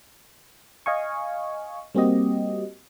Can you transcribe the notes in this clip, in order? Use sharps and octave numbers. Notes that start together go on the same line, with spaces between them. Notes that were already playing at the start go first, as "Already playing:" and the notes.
D#5 F5 G#5 C#6
G3 A#3 C4 F#4 G4 D#5